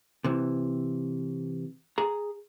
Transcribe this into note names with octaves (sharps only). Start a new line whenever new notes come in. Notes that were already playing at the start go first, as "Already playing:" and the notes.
C3 E3
G#4 A#5